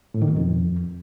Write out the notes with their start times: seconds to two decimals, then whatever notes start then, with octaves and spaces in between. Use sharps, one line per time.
0.14 A2
0.22 D#3
0.29 B2
0.37 F2